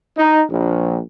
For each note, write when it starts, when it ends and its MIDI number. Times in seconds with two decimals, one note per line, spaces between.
0.17 0.42 63
0.49 0.97 34